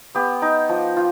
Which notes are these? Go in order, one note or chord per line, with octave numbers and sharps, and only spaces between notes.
B3 G4
D#4
F3
F4